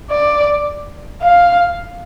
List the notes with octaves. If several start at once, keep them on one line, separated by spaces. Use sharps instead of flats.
D5
F5